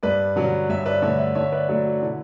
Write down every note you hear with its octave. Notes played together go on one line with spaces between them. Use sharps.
G2 B4 D5
D3 F#3 C#4
G2 C#5 E5
B4 D5
D3 A3 C#5 E5
C#5 E5
D3 C#5 E5
B4 D5
F#3 A3 D4
F#4
D3 E4